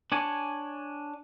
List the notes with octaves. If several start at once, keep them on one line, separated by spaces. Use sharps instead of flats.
D4 C#5 G#5